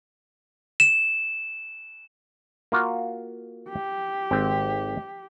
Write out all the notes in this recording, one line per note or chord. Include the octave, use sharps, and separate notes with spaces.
E7
A#3 F4 F#4
G4
G#1 C4 G5